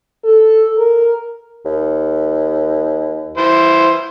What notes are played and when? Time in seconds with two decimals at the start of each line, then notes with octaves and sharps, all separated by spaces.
0.24 A4
0.78 A#4
1.65 D#2
3.37 E3 C5